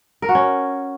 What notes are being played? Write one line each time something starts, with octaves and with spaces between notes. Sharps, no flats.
A#4
F#4
C#4